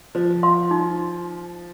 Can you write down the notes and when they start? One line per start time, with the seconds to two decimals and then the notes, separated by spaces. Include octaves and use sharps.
0.15 F3 C5
0.43 F5 C6
0.71 D#4